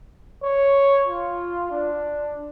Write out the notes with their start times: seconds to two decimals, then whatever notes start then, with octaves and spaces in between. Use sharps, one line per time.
0.43 C#5
1.07 F4
1.71 D4